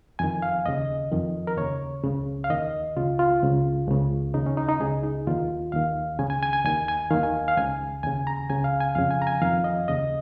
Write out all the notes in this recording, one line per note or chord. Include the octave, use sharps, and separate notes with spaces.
F2 D#3 G#5
F5
D#2 C#3 D#5
F2 D#3
A#4
D#2 C#3 C#5
C#2 C#3
F5
D#2 D#3 D#5
C#2 C#3 F4
F4
C#2 C#3
C#2 C#3
D#2 C#3 D#4
C#4
D#4
D#4
C#2 C#3 G#4
D#4
D#2 D#3 F4
D#2 D#3 F5
C#2 C#3 G#5
G#5
G#5
G#5
D#2 D#3 G#5
G#5
D#2 D#3 F5
G#5
F5
C#2 C#3 G#5
D#2 C#3 G#5
A#5
C#2 C#3 G#5
F5
G#5
F2 C#3 F5
G#5
A#5
G#5
F2 D#3 F5
D#5
D#2 C#3 D#5